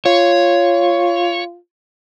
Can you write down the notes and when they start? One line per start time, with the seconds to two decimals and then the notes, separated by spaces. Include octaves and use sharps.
0.06 F4 C#5